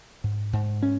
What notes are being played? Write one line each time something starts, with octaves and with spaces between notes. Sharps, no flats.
G#2
G#2
C#4